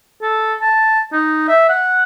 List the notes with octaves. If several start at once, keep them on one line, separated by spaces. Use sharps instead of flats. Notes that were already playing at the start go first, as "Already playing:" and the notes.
A4
A5
D#4
E5
F#5